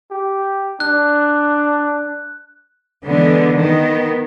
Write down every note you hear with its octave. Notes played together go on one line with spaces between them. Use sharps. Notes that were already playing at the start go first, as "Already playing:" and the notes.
G4
D4 F#6
D3 E3 G#3 B3 D4
D#3 B3